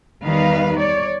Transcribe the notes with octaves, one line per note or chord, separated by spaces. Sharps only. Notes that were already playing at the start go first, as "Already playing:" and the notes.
E2 D#3 G3 D#4 B4 F5
C#5 D5